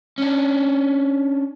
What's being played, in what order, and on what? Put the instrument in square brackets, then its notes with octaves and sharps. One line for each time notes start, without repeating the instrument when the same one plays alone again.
[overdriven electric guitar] C#4 D4